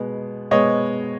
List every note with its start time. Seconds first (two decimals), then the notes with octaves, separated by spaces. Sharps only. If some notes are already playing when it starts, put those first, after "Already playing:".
Already playing: B2 G#3 B3
0.51 B2 G#3 B3 C#5 D#5